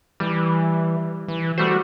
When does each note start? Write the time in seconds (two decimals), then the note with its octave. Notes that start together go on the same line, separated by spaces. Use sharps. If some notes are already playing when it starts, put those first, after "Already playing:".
0.20 E3 G3
1.28 E3
1.58 G3 A3 F#4 C5